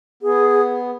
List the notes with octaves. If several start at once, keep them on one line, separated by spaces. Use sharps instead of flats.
B3 G#4